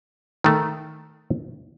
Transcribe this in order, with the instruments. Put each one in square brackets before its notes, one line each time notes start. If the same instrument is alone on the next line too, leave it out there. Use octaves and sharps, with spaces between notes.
[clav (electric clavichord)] D#3 A3